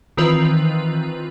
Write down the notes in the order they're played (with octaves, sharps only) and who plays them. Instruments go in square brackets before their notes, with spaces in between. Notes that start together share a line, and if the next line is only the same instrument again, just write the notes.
[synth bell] D#3 E3 C4 F4 B4